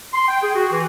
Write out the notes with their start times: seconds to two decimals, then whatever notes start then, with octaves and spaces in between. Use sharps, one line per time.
0.14 C6
0.28 G5
0.42 G#4
0.55 F#4
0.71 E3